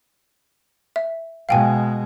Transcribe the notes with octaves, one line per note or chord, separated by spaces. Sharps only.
E5
B2 G#3 F5 G5 G#5